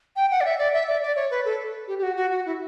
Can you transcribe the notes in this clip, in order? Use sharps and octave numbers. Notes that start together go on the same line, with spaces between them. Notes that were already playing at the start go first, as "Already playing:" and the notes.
G5
F#5
D5
E5
D5
E5
D5
D5
C#5
B4
A4
G4
G4
F#4
F#4
F#4
E4